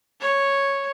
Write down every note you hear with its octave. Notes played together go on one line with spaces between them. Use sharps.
C#5